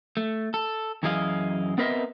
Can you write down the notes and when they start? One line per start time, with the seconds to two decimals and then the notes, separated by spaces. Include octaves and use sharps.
0.17 A3
0.54 A4
1.03 F#2 E3 E4 G#4 D#5 F5
1.78 B3 C4 A#4 B4 D#5 E5